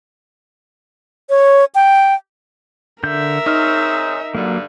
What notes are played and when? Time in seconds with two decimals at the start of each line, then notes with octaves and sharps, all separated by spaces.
1.30 C#5
1.75 G5
3.04 D3 A#4 E5 G6
3.46 C4 D#4 G#4 C#5 F6
4.35 G2 D3 F#3 A#3